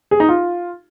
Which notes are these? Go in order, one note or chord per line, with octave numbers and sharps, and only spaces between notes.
G#4
D#4
F4